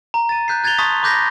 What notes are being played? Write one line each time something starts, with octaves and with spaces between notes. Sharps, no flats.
A#5
A6 D#7
F#6 G6 B6 C7
F#6 G#6 A6 C7 F7 G7
A5 C6 C#6 D#6 A6 B6
B5 D6 F#6 G6 A#6 B6